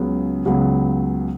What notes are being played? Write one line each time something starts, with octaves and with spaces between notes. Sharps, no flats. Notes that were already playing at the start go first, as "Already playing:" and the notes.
Already playing: C#2 C#3 F#3 B3
C#2 C#3 F#3 B3